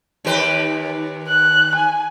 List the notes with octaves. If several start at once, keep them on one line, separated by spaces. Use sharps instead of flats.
D#2 G4 B4
F#6
G#5